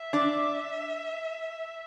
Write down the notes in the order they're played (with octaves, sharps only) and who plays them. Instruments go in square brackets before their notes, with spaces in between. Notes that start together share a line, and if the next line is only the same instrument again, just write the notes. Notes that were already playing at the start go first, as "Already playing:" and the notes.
Already playing: [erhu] E5
[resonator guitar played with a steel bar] D4 D5